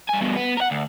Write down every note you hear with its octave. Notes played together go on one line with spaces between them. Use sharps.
G2 G#5
G2 B2
B3
A#4 F#5
D2